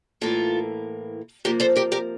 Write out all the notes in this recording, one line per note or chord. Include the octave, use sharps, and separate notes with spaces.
A2 E3 A#3 F4 A4
C3 F3 A#3 G4 A#4
A4 C5
G4 A#4
G4 A#4